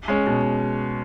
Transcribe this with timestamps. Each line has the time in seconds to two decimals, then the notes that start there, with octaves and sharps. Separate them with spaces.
0.08 G#3 C#4
0.27 B2